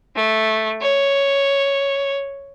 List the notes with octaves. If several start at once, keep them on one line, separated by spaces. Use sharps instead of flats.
A3
C#5